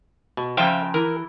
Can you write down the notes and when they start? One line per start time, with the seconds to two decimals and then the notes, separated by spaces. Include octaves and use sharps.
0.37 B2
0.57 C#3 F3 C5 E5 F5 G5
0.94 E3 A#4